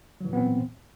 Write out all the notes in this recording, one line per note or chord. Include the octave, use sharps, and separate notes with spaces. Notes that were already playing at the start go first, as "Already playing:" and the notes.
A#2 E3 F#3 B3 C4